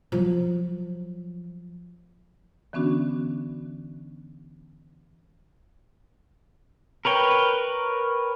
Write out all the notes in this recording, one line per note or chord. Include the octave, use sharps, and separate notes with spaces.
F3 F#3
D3 E3 B3 C#4 D4 F#4
A#4 B4 C#5 G5